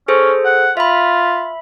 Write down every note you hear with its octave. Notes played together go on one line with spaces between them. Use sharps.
C#4 G#4 A4 C5
F#5
F4 E5 B5